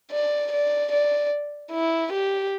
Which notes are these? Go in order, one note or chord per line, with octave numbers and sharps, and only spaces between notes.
D5
D5
D5
E4
G4